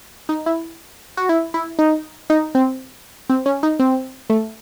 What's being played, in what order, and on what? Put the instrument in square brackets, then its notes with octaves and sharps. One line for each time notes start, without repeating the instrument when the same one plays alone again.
[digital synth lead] D#4
E4
F#4
E4
E4
D#4
D#4
C4
C4
C#4
D#4
C4
A3